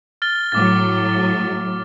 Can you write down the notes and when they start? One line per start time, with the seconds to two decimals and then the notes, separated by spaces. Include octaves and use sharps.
0.22 F6 A6 G7
0.52 A2 F#3 D6 A6